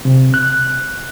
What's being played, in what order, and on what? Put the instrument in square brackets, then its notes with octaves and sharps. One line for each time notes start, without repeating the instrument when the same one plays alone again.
[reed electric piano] C3
F#6